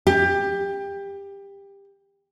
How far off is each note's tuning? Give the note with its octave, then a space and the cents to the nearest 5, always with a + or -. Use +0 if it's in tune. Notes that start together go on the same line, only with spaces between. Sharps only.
G4 +20